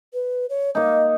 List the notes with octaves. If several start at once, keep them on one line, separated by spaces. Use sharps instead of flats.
B4
C#5
A#3 D#4 D#5